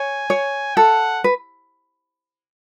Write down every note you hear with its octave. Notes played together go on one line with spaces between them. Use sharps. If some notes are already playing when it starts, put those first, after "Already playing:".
Already playing: C#5 G#5
C#5
A4 F#5
B4